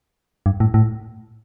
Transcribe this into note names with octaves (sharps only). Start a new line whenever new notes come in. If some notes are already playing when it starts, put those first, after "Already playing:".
G2
A2
A2